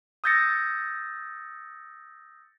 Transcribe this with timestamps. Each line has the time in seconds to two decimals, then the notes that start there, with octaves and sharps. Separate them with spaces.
0.24 D#6 E6 G6 A6 A#6 C#7